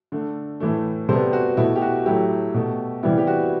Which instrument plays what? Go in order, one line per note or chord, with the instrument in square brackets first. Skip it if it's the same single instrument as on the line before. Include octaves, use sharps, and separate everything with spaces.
[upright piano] D3 A3
A2 E3 A3
C3 G3 B3 A4 C5
F#4
B2 A3 E4
G4
F#4
A2 F#3 A3 E4 G4
B2 A3
C3 E3 G3 B3 E4
G4
F#4